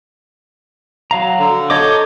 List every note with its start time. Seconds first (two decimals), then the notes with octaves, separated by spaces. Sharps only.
1.11 F#3 F5 A#5
1.38 D3
1.70 A4 C#5 D#5 D6 G6